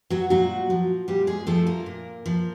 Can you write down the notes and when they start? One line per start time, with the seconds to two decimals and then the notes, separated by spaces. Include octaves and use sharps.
0.10 F#3 F#4
0.30 A#2 F#3 F#4
0.70 F3
1.08 A#2 G3 G4
1.27 G#3 G#4
1.47 F3 A3 A4
1.67 A#3 A#4
1.86 A#2
2.26 F3